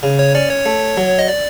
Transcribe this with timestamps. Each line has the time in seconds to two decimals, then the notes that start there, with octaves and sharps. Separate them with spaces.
0.03 C#3
0.19 C#5
0.35 C#4 D5
0.50 C#5
0.66 A3
0.97 F#3
1.19 D#5
1.28 D5